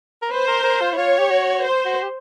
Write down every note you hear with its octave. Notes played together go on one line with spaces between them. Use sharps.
A#4
B4 C5
A#4
A#4
F4
E4
F4 C#5
G4
F#4
C5
F#4
G4